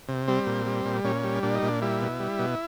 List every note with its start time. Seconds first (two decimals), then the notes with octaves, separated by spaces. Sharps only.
0.08 C3
0.28 G3 C4
0.47 A#2
0.66 G3
0.85 A#2
1.04 A#2 C#4
1.24 G3
1.43 A#2 D4
1.55 D#4
1.63 A#2 D4
1.82 G3 E4
2.02 B2
2.20 G3
2.39 B2